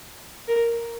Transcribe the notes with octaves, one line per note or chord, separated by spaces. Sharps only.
A#4